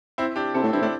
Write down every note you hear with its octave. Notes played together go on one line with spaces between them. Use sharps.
C4 E4
D4 G4
C3 E4 A4
A2
G2 C4 E4
A2 D4